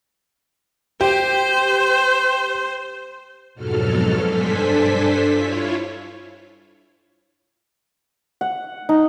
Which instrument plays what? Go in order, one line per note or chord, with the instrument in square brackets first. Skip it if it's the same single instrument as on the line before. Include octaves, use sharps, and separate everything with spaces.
[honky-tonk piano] G4 [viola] C5
[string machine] F2 G#2 B2 F#3 A4 F6
G2 D4 A4 C5 G#5 B6
E4 F4 C#5
[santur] F#5
D#4